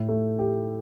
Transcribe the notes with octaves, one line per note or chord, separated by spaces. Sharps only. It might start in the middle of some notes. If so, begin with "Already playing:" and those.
Already playing: A2
A3
G4